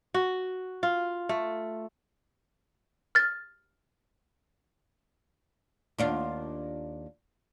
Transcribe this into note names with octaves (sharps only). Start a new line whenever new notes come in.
F#4
F4
A3
F6 A6
D#2 D4 F4